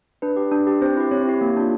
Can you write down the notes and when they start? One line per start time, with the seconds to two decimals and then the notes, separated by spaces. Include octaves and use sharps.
0.22 D4 B4
0.37 G4
0.52 D4
0.67 G4
0.81 C4 C5
0.97 E4 G4
1.11 C4 C#5
1.27 E4 G4
1.41 A#3
1.57 D4 F4